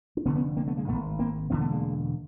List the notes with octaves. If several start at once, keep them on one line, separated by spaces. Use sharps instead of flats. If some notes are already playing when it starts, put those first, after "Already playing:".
D4
F1 F2 D3 B3 C#4
B3 C#4
A#3 C4
A3 B3
G#3 A#3
G#1 G#2 A3 B3
A#3 C4
E1 D#2 D3 B3 C#4
A3 B3
G#3 A#3